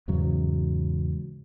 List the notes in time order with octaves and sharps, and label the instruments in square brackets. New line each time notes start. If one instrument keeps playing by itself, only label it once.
[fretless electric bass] E2 G#2 C#3 F#3